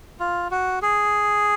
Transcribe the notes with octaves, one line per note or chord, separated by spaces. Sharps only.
F4
F#4
G#4